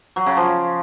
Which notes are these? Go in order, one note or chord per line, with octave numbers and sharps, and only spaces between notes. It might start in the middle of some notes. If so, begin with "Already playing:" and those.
F#3
C#3
F3